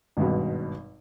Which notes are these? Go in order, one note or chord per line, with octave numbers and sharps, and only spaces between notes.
G#1 G2 B2